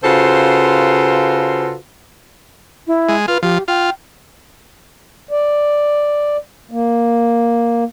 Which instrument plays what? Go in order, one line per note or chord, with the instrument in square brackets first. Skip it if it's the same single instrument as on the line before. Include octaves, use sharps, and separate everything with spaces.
[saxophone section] C#3 F4 F#4 A4 B4 C5
[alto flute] E4
[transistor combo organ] G#3
[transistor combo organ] F4 [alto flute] B4
[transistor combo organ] F3 [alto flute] G4
[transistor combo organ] F4 [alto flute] G5
[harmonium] D5
A#3